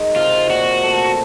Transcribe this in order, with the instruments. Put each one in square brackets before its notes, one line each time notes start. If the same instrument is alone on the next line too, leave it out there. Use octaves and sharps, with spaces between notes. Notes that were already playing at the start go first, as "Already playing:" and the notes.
Already playing: [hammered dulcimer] D#3 G#3
[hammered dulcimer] C3 [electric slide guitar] F4
[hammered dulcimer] A#2 [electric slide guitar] F#4
[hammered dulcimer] A3